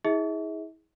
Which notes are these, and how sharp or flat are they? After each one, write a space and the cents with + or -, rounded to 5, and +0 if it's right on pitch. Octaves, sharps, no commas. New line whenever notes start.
E4 -35 G#4 +0 E5 -45